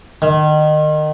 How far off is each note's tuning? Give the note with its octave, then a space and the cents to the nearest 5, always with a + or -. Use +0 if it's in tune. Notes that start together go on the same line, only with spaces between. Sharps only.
D#3 -30